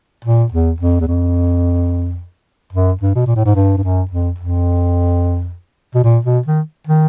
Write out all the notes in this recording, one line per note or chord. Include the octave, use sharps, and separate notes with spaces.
A#2
E2
F2
E2
F2
F#2
G2
B2
A#2
A2
G#2
G2
G2
F#2
F2
F2
B2
A#2
B2
D#3
D#3